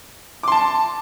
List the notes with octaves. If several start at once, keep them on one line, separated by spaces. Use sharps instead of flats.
A5 C6 D6